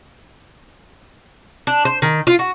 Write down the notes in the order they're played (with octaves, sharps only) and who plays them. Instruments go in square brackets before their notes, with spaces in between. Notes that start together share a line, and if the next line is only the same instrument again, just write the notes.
[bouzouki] D4
C5
D#3
F4
F#4